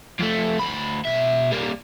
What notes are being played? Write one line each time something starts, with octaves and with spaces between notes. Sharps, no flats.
F2 A3
D2 B5
B2 E5
G3 A#3